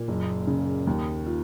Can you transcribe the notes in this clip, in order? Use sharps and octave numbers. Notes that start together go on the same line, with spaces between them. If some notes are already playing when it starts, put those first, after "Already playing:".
Already playing: A#2
F#1
C#3
D#2
F4